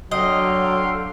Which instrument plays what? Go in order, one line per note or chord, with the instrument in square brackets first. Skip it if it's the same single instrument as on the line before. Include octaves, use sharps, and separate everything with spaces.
[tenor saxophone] D3 [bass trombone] F#3 [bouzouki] D#5 [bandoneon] F5 G5 C6